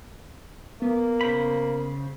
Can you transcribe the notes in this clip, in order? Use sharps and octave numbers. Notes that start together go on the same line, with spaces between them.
A#3 B3
C#3 C5 B5